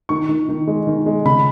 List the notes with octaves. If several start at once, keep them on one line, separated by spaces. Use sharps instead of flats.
D#3 C#6
D#3
D#3
G#3
D#3
G#3
C#3 B5